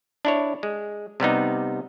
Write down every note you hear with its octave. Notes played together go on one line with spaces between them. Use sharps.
D4 E4 C#5
G#3
C3 G3 B3 D#4